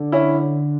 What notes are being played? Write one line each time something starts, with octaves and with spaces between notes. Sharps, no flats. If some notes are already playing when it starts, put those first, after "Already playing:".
Already playing: D3
C#4 E4